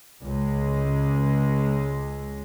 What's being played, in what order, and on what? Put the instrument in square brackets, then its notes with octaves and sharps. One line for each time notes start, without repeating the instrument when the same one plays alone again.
[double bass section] C#2 G#3